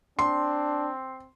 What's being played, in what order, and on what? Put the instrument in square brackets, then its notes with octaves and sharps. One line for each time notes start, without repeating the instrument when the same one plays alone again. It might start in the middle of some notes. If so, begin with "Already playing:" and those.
[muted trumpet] C4 [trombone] D4 [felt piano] C6